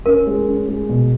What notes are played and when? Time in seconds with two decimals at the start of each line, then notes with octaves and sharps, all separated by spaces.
0.06 C#4 A#4
0.27 G#3
0.48 C#4
0.68 G#3
0.89 B2